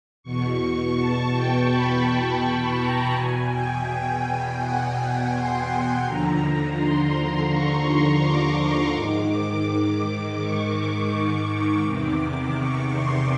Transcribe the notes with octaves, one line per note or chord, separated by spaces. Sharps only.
E2 B2 C#6
C#6
A5
G5
B5
B5
A#5
E2 B2 G#5
G5
F#5
C6
D#2 D3 F3 A#5
C6
C#6
D6
G#2 D#3 D6
D6
C#6
D6
E2 C3 D#3
C#6
C6